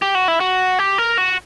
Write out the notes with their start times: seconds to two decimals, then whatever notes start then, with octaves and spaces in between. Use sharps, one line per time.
0.02 G4
0.15 F#4
0.28 E4
0.40 F#4
0.79 G4
0.98 A#4
1.18 F#4